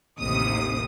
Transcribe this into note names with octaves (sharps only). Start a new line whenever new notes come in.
A1 D#2 C3 D#6